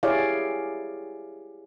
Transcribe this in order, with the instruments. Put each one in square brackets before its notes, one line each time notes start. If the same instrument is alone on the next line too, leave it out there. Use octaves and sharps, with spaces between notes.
[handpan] E4 G4 G#4 C#5 D5 F5